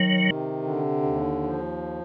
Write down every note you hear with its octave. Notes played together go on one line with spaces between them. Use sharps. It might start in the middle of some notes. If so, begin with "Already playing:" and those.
Already playing: D#3 F#3
C3
D3
D#2
F3